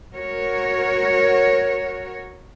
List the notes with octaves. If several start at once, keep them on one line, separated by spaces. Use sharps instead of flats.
F#4 A#4 C#5